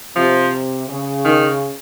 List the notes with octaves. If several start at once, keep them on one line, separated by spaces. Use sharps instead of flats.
C3 F3
C#3
D#3